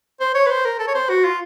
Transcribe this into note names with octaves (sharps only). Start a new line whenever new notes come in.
C5
C#5
B4
C5
A#4
A4
C#5
C5
F#4
F4